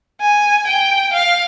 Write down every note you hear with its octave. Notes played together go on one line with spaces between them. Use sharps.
G#5
G5
F5